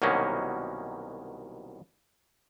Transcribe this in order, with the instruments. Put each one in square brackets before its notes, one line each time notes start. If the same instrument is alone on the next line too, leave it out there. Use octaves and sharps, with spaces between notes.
[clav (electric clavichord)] C2 B2 D#3 F#3 A#3 C#4